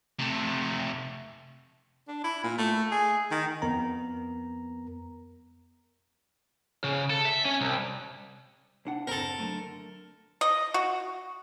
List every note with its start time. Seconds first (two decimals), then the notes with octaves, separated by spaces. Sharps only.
0.19 C3 A3
2.08 D4
2.24 E4
2.43 A#2
2.58 A3
2.92 G#4
3.31 D#3
3.62 F2 B3 A#4 A#5
6.84 C#3
7.10 A4
7.25 E5
7.45 C#4
7.61 C2
8.85 C2 D4 F#5
9.07 C4 A4 A#4 A#5
9.40 D3 F#3 A3
10.41 D#5
10.74 F#4